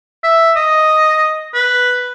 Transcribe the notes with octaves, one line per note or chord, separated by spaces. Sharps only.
E5
D#5
B4